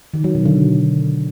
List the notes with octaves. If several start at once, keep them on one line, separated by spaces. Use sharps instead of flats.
D#3
F#3
B2
D3